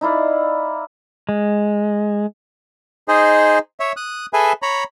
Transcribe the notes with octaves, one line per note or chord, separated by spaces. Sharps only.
D#4 E4 D5 F5
G#3
D#4 G#4 C5 D#5
C#5 E5
D#6 F#6
G#4 A4 B4 E5 G#5
C#5 A#5 B5